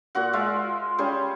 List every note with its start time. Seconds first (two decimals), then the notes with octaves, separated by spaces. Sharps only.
0.15 A#2 F#4 F#5
0.33 G#3 F4 E5
0.98 G3 C#4 G#4 C5